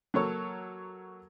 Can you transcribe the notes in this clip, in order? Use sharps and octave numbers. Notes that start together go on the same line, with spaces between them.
F#3 A#3 A4 C#5